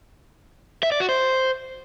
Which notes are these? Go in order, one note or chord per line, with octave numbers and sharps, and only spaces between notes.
E5
D5
F#4
C5